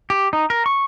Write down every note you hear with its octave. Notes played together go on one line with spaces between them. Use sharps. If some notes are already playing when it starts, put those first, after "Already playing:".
G4
D#4
A#4
C#6